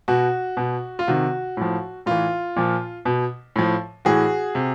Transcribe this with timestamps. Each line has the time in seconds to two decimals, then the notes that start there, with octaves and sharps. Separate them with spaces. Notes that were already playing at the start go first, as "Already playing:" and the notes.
0.08 B2 F#4
0.57 B2
0.99 F4
1.08 C3 D#3 F#4
1.57 A2 F3
2.06 A2 E3 F4
2.56 A#2 F3
3.05 B2
3.56 A2 F3
4.05 A2 E3 F#4 G#4
4.55 C3